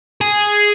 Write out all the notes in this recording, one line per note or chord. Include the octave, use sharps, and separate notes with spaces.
G#4